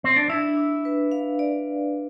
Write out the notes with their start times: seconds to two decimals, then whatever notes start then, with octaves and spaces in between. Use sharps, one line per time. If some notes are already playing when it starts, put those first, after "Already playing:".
0.04 C4
0.16 D4
0.29 D4 E4
0.57 D4
0.85 B4
1.12 F5
1.39 D5